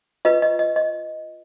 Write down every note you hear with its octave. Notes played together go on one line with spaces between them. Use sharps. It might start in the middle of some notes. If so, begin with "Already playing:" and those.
F4 B4 D#5
D#5
D#5
D#5